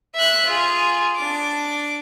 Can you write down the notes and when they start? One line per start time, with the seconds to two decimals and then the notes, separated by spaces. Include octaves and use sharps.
0.14 E5 F#6
0.46 F4 G#4
1.16 D4 D6